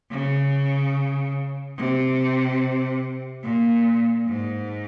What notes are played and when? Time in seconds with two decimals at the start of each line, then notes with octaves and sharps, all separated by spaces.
0.11 C#3
1.77 C3
3.43 A#2
4.26 G#2